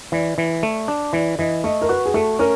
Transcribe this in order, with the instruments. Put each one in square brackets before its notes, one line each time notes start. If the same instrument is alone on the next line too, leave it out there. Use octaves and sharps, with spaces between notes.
[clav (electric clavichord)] E3 [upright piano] D5
[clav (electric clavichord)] E3
A3
D4
[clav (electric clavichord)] E3 [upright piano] D5
[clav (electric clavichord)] E3 [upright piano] D#5
[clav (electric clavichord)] A3 [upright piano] D#5
[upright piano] A#4
[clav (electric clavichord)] F#4 [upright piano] B4
[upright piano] G#4
[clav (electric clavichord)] A3 [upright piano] A4
[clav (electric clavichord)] C#4 [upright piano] A#4